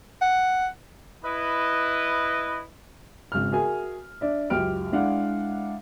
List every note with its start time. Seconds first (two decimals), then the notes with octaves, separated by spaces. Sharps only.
0.21 F#5
1.24 E4 B4 D#5
3.32 G#1 C#3 F6
3.52 F#4 G#4 A#4 E5 G#5
4.21 D4 D5 E5
4.50 C#2 F#2 G4 G5 F6 D7
4.92 G#3 D4 E4 F5 F#5